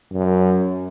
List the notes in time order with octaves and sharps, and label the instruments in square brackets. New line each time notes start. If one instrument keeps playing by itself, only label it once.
[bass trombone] F#2